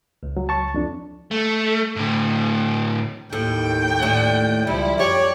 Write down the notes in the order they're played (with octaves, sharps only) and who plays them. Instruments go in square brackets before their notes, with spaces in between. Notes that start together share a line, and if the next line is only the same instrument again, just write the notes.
[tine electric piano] C#2
[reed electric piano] F#3
A5 C#6
F2 D4
[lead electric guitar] A3
A2 D3
[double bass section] D#2 [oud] A2 [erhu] G5
[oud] A2 D4
[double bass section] C#2 F3 [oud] G3 [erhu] E4
[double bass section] F#2 [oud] G4 [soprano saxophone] C#5 [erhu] D5